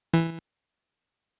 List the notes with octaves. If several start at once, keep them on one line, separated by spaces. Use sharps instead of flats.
E3